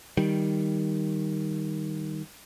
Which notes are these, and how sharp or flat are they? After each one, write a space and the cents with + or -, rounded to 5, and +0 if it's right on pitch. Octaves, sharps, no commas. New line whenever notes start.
D#3 +0 G3 +0